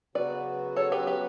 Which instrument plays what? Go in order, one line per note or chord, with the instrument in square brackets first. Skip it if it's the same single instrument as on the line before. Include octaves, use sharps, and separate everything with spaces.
[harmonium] C#3 F#3 B3 F#4 [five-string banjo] B4 D5
[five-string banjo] A4 C#5
G4 B4
G4 B4